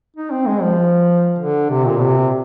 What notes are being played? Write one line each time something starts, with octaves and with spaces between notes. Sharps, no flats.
D#4
C4
G#3
F3
D3
C3
A#2
C3